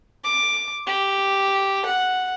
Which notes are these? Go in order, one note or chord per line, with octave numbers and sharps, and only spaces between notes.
D6
G4
F#5